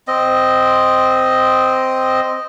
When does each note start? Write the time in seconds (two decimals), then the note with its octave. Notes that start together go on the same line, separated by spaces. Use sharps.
0.08 C4 D#5